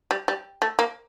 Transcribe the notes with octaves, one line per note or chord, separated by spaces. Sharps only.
G3
G3
A3
A#3